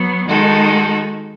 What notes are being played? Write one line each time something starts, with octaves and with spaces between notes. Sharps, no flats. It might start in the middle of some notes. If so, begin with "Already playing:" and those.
Already playing: F#3 B3
D#3 G#3 D#4 F#4 A4